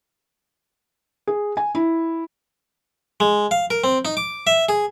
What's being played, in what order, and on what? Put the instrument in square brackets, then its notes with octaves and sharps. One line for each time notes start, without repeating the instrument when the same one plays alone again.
[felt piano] G#4
G#5
E4
[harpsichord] G#3
F5
A#4
C4
D#4
D6
E5
G#4